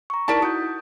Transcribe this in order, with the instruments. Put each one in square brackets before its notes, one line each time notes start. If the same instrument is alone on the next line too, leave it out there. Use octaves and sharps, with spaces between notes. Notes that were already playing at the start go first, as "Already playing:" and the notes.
[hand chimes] A#5 C#6
[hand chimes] D#4 E4 B6 [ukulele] A#4 D5 A5
[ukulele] F#4 [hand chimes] D#6 G6